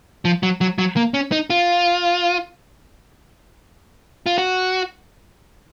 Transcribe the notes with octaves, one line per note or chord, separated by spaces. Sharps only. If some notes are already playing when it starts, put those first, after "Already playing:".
F3
F#3
F#3
F#3
A#3
C#4
D#4
F4
F4
F#4